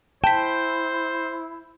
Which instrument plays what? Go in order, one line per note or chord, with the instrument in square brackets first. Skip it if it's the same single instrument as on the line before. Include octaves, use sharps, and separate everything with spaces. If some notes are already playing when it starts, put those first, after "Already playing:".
[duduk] E4 [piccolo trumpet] C5 [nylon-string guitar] G5 [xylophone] A5 B6